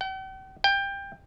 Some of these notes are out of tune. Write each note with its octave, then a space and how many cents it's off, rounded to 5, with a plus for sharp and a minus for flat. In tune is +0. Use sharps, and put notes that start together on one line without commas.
G5 -45
G5 +20